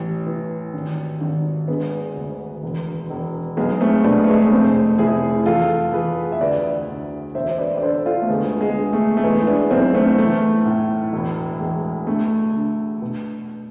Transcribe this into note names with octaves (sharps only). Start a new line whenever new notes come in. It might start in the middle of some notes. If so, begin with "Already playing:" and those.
Already playing: A1
E3
G#1
G#1
D3 G#3 B3
D2
E1
E1
B1 G#3 B3
A3 C4
B2 B3 D4
A3
G#3 B3
D4
F1 A3 C4
F1 E4 G#4
E2 F4 A4
E2 G#4 B4
E5
D2 B4 D5
D2
E1 C5 E5
C5
B4 D5
D5
D3 A4 C5
F4 A4
A3
D2 G#3 B3
G#3 B3
D3
A3
A3
E3 G#3 B3
E4
B3 D4
B1 C4 E4
A3 C4
E3 A3
A2
E1
E2 G#3
D3 A3
D3
B2